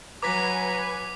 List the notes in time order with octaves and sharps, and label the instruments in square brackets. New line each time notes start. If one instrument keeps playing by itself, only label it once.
[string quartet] F#3 [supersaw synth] B4 G#5 [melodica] A#5 [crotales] D6 B6